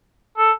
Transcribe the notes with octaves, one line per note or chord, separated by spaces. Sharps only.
A4